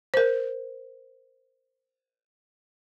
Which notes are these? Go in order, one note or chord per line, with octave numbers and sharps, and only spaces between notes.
A#4 C5